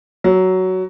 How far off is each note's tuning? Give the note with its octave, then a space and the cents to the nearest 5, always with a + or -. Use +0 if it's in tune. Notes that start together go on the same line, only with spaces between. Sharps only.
F#3 +10